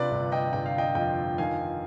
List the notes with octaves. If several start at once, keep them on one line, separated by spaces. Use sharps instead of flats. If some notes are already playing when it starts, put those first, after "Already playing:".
Already playing: C3 D4 F4 B4 D5
G1
D#5 G5
G1 G5
F5
D#5 G5
F2 D#5 G5
D#3 F5 G#5